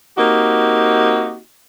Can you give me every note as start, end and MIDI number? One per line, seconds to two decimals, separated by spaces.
0.18 1.39 58
0.18 1.39 60
0.18 1.39 63
0.18 1.39 66
0.18 1.39 67